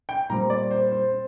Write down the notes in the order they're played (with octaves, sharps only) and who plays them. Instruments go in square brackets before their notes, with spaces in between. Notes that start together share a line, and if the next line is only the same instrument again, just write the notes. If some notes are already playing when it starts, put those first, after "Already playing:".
[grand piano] G5
A#2 G3 C4 A#5
D5
C5
C5
C4